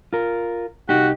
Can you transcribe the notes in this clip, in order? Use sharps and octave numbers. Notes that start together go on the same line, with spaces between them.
F4 A#4
C2 D#4 F#4 G4